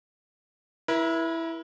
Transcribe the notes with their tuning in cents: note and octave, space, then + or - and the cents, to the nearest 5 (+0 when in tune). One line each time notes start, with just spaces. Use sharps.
E4 +0 A#4 +45